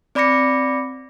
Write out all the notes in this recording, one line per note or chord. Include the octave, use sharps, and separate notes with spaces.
C4 D5 B5 D6 A#6 C#7